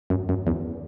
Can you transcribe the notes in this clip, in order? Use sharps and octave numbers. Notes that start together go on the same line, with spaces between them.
F#2
F#2
E2